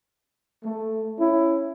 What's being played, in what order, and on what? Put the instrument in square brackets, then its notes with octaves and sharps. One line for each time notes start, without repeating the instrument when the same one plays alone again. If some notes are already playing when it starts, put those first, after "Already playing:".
[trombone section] A3
C#4 E4